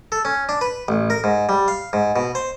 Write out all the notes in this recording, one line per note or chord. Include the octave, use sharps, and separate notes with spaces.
A4
C#4
D4
B4
A1
A#4
G#2
G3
F5
G#2
B2
C5